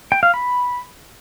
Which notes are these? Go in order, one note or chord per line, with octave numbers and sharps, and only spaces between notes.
G5
F5
B5